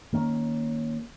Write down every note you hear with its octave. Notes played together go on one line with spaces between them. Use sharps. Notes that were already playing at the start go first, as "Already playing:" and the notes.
D#3 A#3 C#4